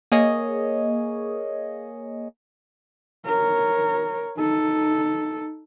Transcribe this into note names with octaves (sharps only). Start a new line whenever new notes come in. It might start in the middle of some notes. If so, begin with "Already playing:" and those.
A#3 G#4 C#5 D#5
A#4 C#5
D#4 A4